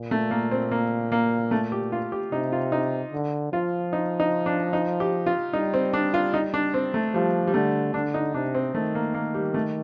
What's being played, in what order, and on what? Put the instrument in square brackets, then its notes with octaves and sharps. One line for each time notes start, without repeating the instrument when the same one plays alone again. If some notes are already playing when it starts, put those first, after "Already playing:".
Already playing: [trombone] A#2
[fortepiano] A3
A#3
C4
A#3
A#3
A3
G4
F4
G4
[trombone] C3 [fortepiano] D#4
[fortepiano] F4
D#4
[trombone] D3
[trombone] F3 [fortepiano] F4
[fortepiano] D#4
D#4
D4
D#4
G4
F4
[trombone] G3 [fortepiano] D#4
[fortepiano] C4
D4
F4
D#4
D4
C4
A3
[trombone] F3 [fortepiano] G3
[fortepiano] G3
[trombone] D3 [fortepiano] A3
[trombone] D3 [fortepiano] D4
[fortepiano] D#4
[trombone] C3 [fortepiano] D4
[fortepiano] C4
[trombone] D#3 [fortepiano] A3
[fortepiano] A#3
A#3
G3
A3